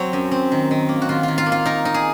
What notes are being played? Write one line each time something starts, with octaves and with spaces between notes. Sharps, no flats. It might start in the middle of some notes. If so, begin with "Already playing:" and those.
Already playing: F#3 C4 C#5
F#2
C4
D#3
D#3
A#3
F#4
D#3 F4
D#3 F4
F4
A#3
F4
D#4 A#4
D#4
G#4